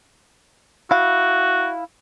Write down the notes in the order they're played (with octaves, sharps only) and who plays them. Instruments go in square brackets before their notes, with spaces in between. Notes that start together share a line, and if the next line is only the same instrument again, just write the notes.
[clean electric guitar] E4 F5 [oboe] F#4